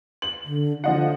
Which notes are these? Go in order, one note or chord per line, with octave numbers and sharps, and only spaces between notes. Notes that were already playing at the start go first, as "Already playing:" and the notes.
F#7
D3
D3 F3 D#5 F#5